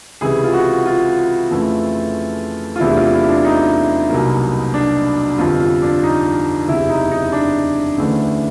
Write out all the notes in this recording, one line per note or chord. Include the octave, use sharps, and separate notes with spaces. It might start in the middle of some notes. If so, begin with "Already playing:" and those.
C#2 C3 E3 G#4
F4
F#4
F4
F2 C#3 E3 A3
F4
E2 C3 E3 A3 D4 E4
F4
E4
D4
D#4
C2 B2 F#3 A#3
D4
G1 F2 C3 F4
F4
D4
D#4
F#1 E2 C3 E4
D#4
D#4
D4
D2 C#3 E3 A3 D4